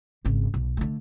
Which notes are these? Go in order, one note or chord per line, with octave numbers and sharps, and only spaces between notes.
G#1 C#3
B1
D3 A3